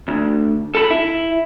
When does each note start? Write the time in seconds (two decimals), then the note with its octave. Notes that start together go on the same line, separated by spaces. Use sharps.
0.08 D2
0.75 A4 A5 B5
0.91 E4